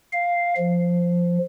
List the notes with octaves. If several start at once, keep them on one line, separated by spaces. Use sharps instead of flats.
F5
F3